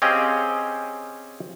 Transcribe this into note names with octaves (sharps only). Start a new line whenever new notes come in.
C4 C#4 G4 G#4 D#5 F5